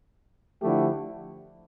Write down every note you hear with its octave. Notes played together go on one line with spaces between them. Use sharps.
D3 F3 A3 E4 G4